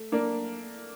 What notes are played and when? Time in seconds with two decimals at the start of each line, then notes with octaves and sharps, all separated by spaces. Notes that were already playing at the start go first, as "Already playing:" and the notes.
Already playing: A3
0.12 A#3 D4